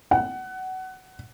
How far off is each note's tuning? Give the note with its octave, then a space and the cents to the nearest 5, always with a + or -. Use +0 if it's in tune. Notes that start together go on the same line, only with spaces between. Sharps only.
F#5 +20